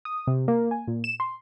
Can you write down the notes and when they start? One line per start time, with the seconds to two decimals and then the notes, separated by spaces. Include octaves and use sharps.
0.05 D#6
0.27 C3
0.48 A#3
0.71 G#5
0.88 A#2
1.04 E7
1.20 C6